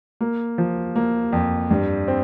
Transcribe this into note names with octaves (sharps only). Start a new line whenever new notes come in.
A#3
F3
A#3
F2
G2
C4